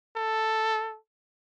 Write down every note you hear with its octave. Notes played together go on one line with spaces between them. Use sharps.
A4